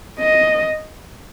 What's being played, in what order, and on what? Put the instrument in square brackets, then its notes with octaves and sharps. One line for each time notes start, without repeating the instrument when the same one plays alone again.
[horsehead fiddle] D#5